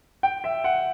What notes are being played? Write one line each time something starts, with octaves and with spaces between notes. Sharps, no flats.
G5
E5
F#5